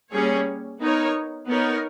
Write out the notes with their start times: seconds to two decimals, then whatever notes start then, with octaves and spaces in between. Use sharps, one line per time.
0.11 G3 A#3 C#4 G#4 C#5
0.80 B3 D#4 A#4 C#5
1.47 B3 D#4 A#4 C#5